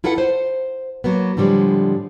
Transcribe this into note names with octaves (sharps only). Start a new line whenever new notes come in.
E4 F4 A4 B4 F#5
C5
F#3 A#3 B3
A2 D3 F3 G3 G#3